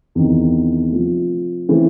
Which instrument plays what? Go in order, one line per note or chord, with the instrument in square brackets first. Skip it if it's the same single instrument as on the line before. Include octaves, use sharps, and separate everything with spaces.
[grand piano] E2 C3 D#3
C3 F3 A3
C#3 E3 A3 C4